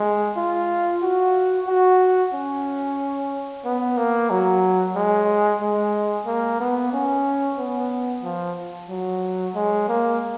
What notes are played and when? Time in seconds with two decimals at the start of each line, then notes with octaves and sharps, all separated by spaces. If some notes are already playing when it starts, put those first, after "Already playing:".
Already playing: G#3
0.36 F4
1.02 F#4
1.67 F#4
2.34 C#4
3.65 B3
3.97 A#3
4.30 F#3
4.95 G#3
5.62 G#3
6.26 A#3
6.60 B3
6.93 C#4
7.58 B3
8.23 F3
8.89 F#3
9.55 G#3
9.88 A#3